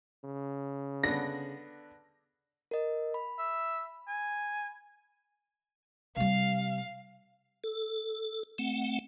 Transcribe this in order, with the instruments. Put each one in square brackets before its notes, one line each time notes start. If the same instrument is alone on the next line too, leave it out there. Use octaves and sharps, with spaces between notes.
[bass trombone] C#3
[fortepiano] D3 B3 [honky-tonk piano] A#6
[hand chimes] A#4 D#5
B5
[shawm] E5
G#5
[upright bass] C3 G3 [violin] F5
[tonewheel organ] A4
A3 C4 F#5